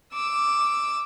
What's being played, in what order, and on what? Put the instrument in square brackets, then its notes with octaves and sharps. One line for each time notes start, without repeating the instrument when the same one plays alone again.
[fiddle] D6 E6